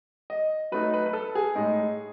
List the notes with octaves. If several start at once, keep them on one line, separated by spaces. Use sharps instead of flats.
D#5
F#3 A3 D#4 B4
B4
B4
A4
G#4
A2 G#3 D#4